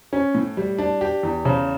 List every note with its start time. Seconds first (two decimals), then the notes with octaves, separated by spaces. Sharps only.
0.13 C#4
0.35 A2
0.57 G3
0.78 D4
1.01 G4
1.23 E2
1.45 C#3